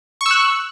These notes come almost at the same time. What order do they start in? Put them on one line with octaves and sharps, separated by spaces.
C#6 E6 F#6